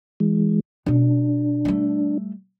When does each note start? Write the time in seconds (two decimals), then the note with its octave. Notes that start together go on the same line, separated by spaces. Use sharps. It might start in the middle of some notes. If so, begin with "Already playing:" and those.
0.20 E3 G#3
0.86 B2 C#4 D4
1.65 G3 A3